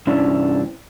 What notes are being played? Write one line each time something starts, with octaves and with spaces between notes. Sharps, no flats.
G2 C3 C#4 D4 E4